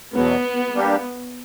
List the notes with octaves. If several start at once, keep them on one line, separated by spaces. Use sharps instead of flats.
E2 B2 F#3 B3
G3 A#3 D4 G4